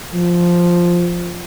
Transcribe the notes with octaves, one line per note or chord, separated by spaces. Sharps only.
F3